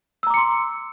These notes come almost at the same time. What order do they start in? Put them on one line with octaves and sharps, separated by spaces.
E6 A#5 D6 C#7 C6